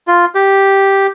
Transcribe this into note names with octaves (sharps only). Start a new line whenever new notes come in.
F4
G4